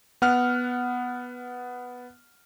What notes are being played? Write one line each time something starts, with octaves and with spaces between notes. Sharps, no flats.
B3 F#5 F6